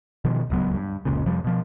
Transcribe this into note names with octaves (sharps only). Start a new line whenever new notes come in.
B2 D#3 F3
D1 C#2 F#3 B3
G2
F1 C#2 A#2 C#3
F2 C3 F3 G3
B2 F3